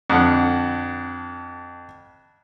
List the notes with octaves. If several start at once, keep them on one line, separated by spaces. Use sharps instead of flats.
F2 D3